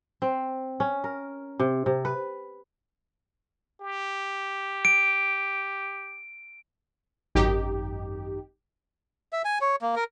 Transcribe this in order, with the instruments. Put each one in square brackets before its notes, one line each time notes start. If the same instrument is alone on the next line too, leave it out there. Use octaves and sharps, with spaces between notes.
[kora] C4
C#4
A#4
C3
C3
B4
[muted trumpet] G4
[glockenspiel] D7
[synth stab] G#1 F#2 D#4 G4
[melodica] E5
G#5
C#5
A#3
A#4